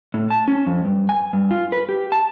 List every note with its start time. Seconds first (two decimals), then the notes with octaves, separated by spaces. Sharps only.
0.14 A2
0.30 A5
0.48 C#4
0.67 F2
0.85 G2
1.09 G#5
1.33 G2
1.51 F4
1.72 B4
1.89 G4
2.12 A5